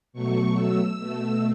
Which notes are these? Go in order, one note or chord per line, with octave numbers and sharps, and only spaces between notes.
B2 F#3 A3 C#6
E6
B2 A3